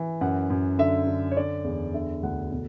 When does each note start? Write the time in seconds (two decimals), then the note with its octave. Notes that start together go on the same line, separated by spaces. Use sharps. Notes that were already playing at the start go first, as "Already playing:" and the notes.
Already playing: E3
0.21 F#2 F#5
0.50 F#2
0.79 D3 E5
1.07 D3
1.31 C#5
1.37 D3 D5
1.65 E2
1.94 D3 E5
2.23 D2 F#5
2.52 B2